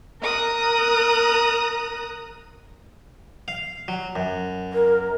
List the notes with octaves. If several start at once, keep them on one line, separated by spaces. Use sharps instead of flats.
A#4 A#5 D#6 F#6
F5
F#3
F#2
A#4